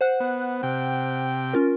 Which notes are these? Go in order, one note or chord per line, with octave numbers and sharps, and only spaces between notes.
C5 F#5 F#6
B3
C3 G5
C#4 F4 A#4